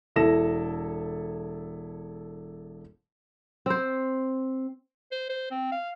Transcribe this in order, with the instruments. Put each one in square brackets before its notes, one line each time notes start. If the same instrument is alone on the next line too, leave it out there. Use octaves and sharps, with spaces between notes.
[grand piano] E1 E4 A4 A#6 E7
[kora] C4 C5
[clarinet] C5
C5
C4
F5